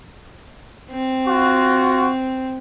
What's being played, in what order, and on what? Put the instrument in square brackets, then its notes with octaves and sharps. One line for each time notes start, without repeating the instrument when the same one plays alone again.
[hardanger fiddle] C4
[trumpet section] F4 F#4